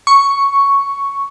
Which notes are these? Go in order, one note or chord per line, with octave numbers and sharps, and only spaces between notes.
C#6